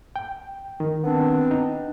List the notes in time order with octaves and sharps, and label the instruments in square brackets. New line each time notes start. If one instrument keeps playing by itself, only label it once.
[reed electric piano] G5
D#3
[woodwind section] B3 C4 D4
[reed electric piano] D#4